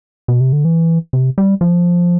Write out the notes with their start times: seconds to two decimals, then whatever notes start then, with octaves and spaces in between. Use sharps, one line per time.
0.28 B2
0.41 C3
0.53 D3
0.65 E3
1.13 C3
1.38 G3
1.61 F3